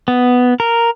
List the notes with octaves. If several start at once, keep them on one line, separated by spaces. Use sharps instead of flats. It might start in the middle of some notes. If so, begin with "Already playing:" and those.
B3
A#4